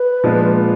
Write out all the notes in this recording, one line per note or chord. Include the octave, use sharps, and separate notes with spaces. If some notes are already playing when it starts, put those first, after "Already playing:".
Already playing: B4
A#2 F3 G#3 B3 D4